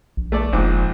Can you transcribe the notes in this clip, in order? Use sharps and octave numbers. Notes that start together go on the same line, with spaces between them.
A#1
A3 A4 D5
F1 A#1 G#2 D6